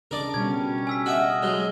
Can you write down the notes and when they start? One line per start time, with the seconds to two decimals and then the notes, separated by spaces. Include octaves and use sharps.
0.11 C#3 D4 A#4 D5 D6
0.34 B2 G3 C#4 G#6
0.87 G#5 E6 B6
1.06 F#4 D#5 E5 F6
1.42 F#3 G#3